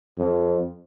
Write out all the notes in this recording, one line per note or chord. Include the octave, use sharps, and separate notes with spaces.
F2